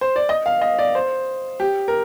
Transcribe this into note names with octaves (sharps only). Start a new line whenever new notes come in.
C5
D5
D#5
F5
D#5
D5
C5
G4
A#4